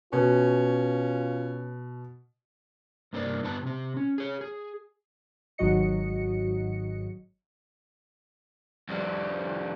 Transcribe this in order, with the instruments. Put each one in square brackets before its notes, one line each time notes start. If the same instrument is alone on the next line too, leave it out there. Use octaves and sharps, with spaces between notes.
[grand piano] B2 [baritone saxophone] C#4 [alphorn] F4
[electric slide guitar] G2 C3 A#3 C4 D4 D5
G2 D3 B3 B4 A5
C3 C4
C#4
G#4 C#5
G#4
[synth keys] G#1 G#2 F#3 F#4 D#5 C#7
[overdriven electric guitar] F2 G3